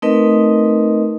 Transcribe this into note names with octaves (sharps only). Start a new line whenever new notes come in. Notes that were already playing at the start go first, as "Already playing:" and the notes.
A3 C4 D#4 A#4 B4 D#5